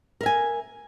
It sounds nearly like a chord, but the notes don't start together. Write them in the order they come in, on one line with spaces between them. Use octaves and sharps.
A#4 E5 G#5